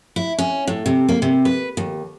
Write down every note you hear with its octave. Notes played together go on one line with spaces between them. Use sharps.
E4
C#4
A2
C3
A#3
C3
B4
D#2